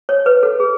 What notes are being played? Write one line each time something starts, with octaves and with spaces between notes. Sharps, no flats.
C#5
B4
A4
G#4